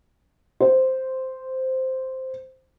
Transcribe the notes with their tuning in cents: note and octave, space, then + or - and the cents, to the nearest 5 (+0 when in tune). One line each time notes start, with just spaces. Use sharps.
C5 -5